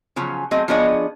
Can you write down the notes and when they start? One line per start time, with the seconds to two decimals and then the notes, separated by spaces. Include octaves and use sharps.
0.16 C#3 F3 F#3 C#4
0.51 F#3 A3 C4 G#4 D#5
0.68 F3 B3 D4 G#4 C#5 D#5